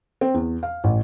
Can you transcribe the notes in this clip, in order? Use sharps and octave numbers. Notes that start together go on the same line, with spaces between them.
C4
E2
F5
A1